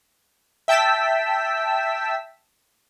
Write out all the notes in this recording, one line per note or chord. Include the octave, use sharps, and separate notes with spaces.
E5 G5 A5 E6 B6